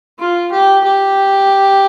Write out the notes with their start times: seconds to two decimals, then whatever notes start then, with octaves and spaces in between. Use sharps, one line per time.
0.19 F4
0.51 G4
0.84 G4